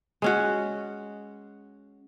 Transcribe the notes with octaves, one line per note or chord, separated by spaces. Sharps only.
G#3 C#4 F#4